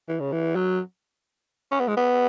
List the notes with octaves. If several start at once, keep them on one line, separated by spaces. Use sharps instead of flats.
E3
C#3
E3
F#3
C#4
B3
G#3
B3